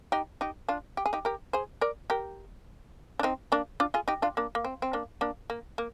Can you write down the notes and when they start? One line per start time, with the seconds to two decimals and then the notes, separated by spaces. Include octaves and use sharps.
0.12 D#4 G4
0.41 D#4 G4
0.68 D4 F4
0.97 G4
1.06 G#4
1.13 D#4 G4
1.25 G4 A#4
1.53 G#4 C5
1.81 A#4 D5
2.10 G4 A#4
3.19 D4
3.23 C4 D#4
3.52 A#3 D4
3.80 D4 F4
3.94 F4 G#4
4.08 D#4 G4
4.22 D4 F4
4.37 A#3 D4
4.55 A#3
4.64 C4
4.82 C4
4.93 A#3 D4
5.21 A#3 D4
5.50 A#3
5.78 A#3